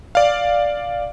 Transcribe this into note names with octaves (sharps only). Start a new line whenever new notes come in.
D5 F5